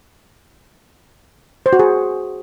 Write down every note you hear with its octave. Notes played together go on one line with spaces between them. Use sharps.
C5
F#4
G#4